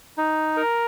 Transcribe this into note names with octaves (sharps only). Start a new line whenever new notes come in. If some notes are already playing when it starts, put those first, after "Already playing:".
D#4
A#4